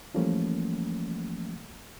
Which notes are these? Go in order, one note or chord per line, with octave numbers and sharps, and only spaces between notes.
E3 F3 G3 A3 A#3 C#4